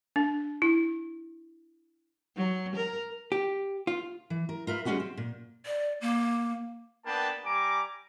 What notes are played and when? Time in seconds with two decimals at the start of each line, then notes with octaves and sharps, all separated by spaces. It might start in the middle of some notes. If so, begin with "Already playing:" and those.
0.16 D4
0.62 E4
2.36 F#3
2.76 A#4
3.32 G4
3.87 F4
4.30 E3
4.49 A#4
4.67 F4 A#4 B4 E5
4.85 G3 G#3 C#4 D4 F#4 G#4
5.00 C4
5.17 A#2
5.66 D5
6.01 A#3
7.06 A#3 B3 D4 G5 A5 B5
7.45 G3 G#5 A#5 D6